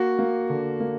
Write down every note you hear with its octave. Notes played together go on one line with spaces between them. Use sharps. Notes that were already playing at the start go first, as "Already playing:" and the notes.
Already playing: A#3 F#4
A#3
D3
A#3